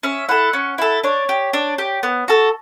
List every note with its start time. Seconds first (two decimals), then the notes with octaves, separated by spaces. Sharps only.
0.03 C#4 E5
0.29 E4 A4 F#5
0.53 C#4
0.78 E4 A4
1.03 D4 C#5
1.29 G4
1.53 D4
1.78 G4
2.03 B3
2.28 F#4 A4